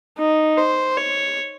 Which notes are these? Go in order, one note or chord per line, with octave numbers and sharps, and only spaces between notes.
D#4
C5
C#5